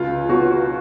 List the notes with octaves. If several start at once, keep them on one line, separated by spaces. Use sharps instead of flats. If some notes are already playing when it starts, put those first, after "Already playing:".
Already playing: C#2 F4
B2 F#4